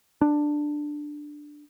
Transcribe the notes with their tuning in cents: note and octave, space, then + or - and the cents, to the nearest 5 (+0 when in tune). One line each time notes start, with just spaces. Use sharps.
D4 +10